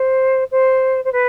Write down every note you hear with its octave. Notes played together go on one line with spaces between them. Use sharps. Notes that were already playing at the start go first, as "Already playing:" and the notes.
Already playing: C5
C5
C5
B4